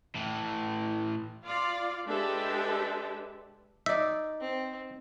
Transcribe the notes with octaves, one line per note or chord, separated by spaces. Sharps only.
A2 E3
F4 D5 F5
G#3 D4 G4 A4 B4 E5
D#4 D5 E5
C4